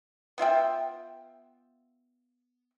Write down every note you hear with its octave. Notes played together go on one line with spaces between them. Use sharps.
B3 F4 E5 G5